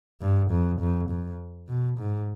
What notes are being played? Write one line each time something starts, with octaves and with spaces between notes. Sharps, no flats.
G2
F2
F2
F2
B2
G#2